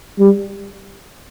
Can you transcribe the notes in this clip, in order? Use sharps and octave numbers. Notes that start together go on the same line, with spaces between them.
G3